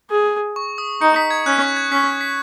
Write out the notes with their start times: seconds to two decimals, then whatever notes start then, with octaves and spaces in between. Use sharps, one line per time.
0.10 G#4
0.56 C#6
0.78 D#6
1.01 D#4 C#7
1.16 B6
1.31 G#6
1.46 C#4 F#6
1.62 C#6
1.77 G#6
1.92 C#4 B6
2.21 B6